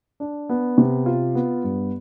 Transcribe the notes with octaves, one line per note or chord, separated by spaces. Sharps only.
D4
B3
C3
F4
B3
G2